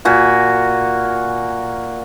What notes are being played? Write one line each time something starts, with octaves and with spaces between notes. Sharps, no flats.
A#2 F#4 G#5